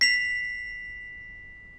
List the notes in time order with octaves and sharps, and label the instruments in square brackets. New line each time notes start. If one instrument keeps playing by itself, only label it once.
[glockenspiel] B6 C7 F7